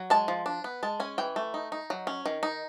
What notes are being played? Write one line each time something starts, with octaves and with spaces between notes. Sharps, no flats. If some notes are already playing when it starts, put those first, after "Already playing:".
Already playing: F#3
G#3 A5
F3
D4
B3
G#3 A5
C#4 G#5
E3 G5
A3
D#4
D#4
F#3
C#4
D#3
D#4